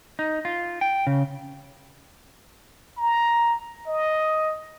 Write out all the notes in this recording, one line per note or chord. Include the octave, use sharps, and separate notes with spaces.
D#4
F4
G5
C#3
A#5
D#5